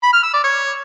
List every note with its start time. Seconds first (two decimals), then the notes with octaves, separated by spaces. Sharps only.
0.03 B5
0.13 F6
0.23 E6
0.33 D5
0.44 C#5